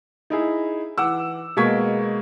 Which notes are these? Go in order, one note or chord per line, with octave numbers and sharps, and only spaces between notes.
D#4 E4 G#4
E3 F#5 D6 E6
B2 G#3 A#3 C#6 G#6 B6